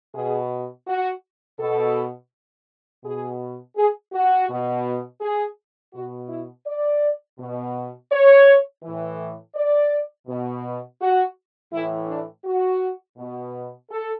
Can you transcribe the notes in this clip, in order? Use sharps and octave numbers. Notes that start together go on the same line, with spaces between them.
B2 G#4
F#4
B2 A4
B2 G#4
G#4
F#4
B2
G#4
B2 F#4
E4
D5
B2
C#5
A2 E3
D5
B2
F#4
A2 E3 E4
D4
F#4
B2
A4